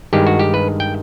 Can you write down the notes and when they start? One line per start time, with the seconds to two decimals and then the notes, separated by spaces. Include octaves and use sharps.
0.13 G2 D#3 G#3 G4
0.27 F#4
0.39 G4
0.54 B4
0.80 G5